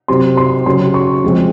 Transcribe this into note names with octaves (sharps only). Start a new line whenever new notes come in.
C3 F#3 C4 C6
C6
C#3 F#3 C#4 C6
C#6
F3 G#3 C4